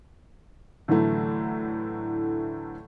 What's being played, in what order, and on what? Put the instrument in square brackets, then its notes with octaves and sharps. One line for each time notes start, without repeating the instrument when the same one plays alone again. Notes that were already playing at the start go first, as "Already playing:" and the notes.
[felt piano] A2 D3 E3 F#3 A3